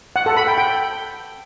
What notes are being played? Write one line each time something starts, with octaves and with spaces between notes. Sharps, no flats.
F#5
A4
B5
G5
G5